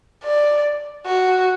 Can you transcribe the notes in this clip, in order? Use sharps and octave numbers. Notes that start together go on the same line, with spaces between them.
D5
F#4